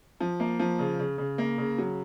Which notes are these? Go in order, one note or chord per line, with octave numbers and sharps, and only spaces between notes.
F3
A#3
F3
C#3
C#3
C#3
A#3
C#3
F#3